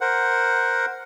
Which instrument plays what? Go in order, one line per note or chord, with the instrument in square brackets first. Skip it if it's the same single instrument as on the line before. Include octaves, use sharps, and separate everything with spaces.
[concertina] A#4 C5 F#5